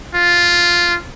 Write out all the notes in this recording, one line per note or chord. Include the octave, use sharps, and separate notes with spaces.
F4